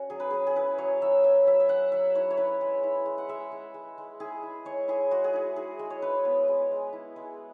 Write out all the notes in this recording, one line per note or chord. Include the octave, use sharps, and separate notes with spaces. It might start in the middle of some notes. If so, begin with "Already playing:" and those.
Already playing: C#4 F#4
F#3 G#4
B4
C#4 G#4
G#4
E4 B4
F#3 C#5
F#3 E5
F#3 E5
F#3 E5
E5
F#3 F#5
F#3 E5
E4 C#5
C#5
E4 B4
G#3
E4
G#3
F#5
G#3 E5
G#3
G#3
G#3
E4 G#4
E4
G#3 C#5
E4 G#4
G#3 F#4
G#4
E4 F#4
E4 G#4
G#3
C#5
E4 B4
B3
G#3
G#3
E4
G#3